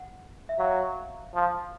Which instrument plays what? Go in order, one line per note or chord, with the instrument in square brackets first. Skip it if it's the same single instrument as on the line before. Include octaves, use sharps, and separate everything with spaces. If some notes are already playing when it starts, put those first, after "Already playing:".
Already playing: [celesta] F#5
E5
[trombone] F#3 [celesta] F5
[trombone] F3